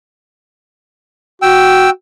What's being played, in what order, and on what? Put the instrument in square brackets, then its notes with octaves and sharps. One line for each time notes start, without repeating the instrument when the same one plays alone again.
[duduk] F#4 [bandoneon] G5 E6